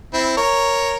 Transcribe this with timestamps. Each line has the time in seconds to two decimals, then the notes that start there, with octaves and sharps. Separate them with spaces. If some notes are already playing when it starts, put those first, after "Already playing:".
0.13 C4 E4
0.37 A#4 C#5